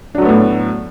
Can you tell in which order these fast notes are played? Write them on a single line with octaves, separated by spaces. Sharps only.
D4 F#3 A3 B3 A2